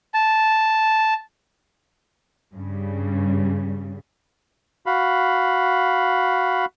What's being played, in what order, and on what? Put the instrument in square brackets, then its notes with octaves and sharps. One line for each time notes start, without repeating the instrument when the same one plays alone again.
[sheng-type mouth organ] A5
[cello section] G2 C#3 G3
[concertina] F#4 F5 B5